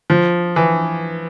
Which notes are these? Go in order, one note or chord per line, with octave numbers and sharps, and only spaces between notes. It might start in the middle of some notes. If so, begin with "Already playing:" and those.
F3
E3